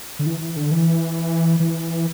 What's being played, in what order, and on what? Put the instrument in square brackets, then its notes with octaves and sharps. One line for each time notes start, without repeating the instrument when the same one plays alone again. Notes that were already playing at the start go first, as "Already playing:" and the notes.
[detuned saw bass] D3
E3
E3
D3
E3
E3